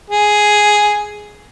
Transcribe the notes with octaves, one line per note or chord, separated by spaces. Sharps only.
G#4